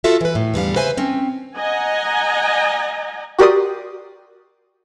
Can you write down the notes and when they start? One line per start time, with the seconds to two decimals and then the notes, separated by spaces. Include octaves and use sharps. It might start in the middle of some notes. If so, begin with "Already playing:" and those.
0.04 F4 F#4 A4 E5
0.21 E3 B4
0.35 A2
0.54 E2 D3 G3 F5
0.76 C#3 B4 C5 E5 G#5
0.97 C4 C#4
1.56 D#5 F#5 G#5 A#5
3.39 F#4 G4 A#4 D5 C6 D#6